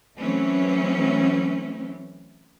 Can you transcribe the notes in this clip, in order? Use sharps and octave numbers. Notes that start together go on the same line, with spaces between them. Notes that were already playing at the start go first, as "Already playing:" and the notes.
E3 F#3 A3 C4 C#4